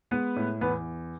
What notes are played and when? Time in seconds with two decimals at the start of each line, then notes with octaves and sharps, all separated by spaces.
0.11 G#3 B3 B4
0.36 A2
0.61 E2 B3 B4